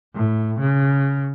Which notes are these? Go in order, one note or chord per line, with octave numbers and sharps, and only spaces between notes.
A2
C#3